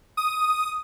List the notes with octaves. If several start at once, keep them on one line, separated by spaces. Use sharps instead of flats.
D#6